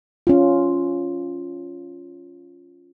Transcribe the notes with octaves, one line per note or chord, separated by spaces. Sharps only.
C#4 F4